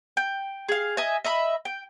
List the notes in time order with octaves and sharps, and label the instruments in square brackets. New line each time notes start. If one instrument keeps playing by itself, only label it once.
[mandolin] G5
G#4 F5
D#5 E5 G#5
D#5 E5 B5
G5